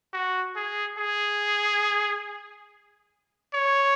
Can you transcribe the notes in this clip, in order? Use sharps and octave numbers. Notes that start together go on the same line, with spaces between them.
F#4
G#4
G#4
C#5